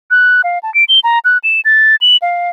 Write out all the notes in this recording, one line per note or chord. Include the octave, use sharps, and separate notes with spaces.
F#6
F5
A5
D7
G7
A#5
F#6
E7
A6
F#7
F5